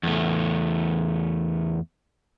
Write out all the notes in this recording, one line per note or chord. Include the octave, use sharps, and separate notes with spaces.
E2 A3